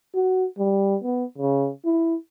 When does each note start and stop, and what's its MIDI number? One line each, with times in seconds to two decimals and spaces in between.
0.15 0.47 66
0.58 0.97 55
1.04 1.25 59
1.38 1.70 49
1.85 2.15 64